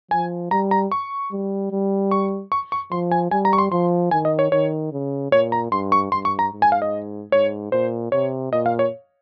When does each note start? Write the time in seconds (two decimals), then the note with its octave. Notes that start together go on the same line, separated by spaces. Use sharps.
0.11 F3 G#5
0.51 G3 A#5
0.71 A#5
0.92 C#6
1.32 G3
1.71 G3
2.11 C#6
2.52 C#6
2.72 C#6
2.91 F3 C6
3.11 G#5
3.31 G3 G#5
3.45 A#5
3.53 C#6
3.58 C6
3.72 F3 C6
4.11 D#3 G#5
4.25 D#5
4.39 C#5
4.52 D#3 C#5
4.92 C#3
5.32 A#2 C#5
5.52 A#5
5.72 G2 C6
5.92 C#6
6.12 G2 C6
6.25 C#6
6.39 A#5
6.52 G#2
6.62 G#5
6.72 F5
6.82 D#5
7.32 G#2 C#5
7.72 A#2 C5
8.12 C3 C#5
8.52 A#2 D#5
8.66 F5
8.79 C#5